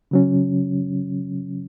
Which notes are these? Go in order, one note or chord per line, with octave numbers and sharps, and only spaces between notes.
C#3 F#3 C#4